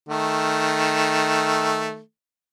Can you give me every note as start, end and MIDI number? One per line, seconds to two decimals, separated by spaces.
0.09 2.00 51
0.09 2.00 57